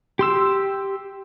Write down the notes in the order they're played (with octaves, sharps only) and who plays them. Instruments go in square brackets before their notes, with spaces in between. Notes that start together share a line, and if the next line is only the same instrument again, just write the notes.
[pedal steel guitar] G4 C6 E6